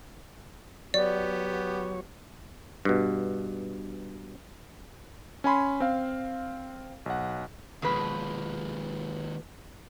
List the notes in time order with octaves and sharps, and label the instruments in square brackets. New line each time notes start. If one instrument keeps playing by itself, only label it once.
[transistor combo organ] F#3 C#5 [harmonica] B3 G4 [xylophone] D5
[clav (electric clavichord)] G2 B2
[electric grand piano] C#4 G#5 B5 C6
C4 F5
B1 F#5
[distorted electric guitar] D#2 G#3 [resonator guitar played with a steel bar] B2 F3 B4